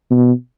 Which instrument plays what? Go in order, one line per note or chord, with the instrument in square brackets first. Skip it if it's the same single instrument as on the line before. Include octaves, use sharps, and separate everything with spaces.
[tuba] B2